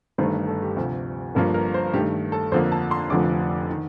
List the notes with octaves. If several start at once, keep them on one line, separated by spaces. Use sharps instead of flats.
G1 G2 D#3 A3 C5
A4
G4
D2 C3 F3
G1 G2 F3 A#3 A4
A#4
C5
G2 D#3 A3 G4
A4
F2 D3 F3 A#3 C5
A5
C6
F1 F2 D3 F3 A3 D6
D#3